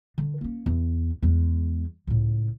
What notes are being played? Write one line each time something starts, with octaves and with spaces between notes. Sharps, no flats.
D3
A#3 C#4
E2
E2 G#3
C#2 A2